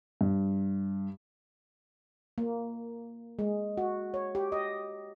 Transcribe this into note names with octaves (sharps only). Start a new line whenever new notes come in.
G2
A#3
G#3
F#4
C#5
G4
D#5